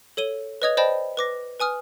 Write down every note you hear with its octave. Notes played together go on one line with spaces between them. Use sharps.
A4 C#5 D#7 G7
B4 C#5 D#5 D#6 G#6 F7
C5 D5 D#5 G5 A5 B5
B4 D6 A#6
B4 G#5 D#6 F6